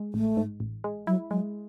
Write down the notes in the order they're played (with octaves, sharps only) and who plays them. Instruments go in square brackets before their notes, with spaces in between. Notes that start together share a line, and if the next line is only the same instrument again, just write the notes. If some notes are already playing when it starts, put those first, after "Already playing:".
Already playing: [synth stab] G#3
[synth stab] A1 [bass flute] A3
[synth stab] G#2
A1
G#3
[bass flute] F#3 [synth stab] E4
[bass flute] F#3 [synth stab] G#3